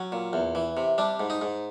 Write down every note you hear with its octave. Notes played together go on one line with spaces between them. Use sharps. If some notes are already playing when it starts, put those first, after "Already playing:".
Already playing: F#3 C#4
A#2
E2
E3
C3
G3 D4
G#2
D#4
G#2